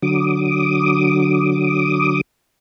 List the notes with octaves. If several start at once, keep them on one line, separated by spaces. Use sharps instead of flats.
D3 F#3 D6 D#6